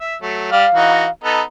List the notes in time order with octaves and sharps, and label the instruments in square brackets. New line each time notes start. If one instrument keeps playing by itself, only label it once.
[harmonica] E5
F#3 A3
[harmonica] G3 D5 F6 [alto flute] F5
[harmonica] E3 D#4 F#4
B3 D#4 A4